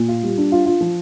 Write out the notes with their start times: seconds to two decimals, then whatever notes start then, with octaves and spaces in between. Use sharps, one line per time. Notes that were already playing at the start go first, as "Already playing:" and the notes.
Already playing: A#2
0.08 F4
0.23 G3
0.38 D4
0.52 F4
0.66 F4
0.81 F3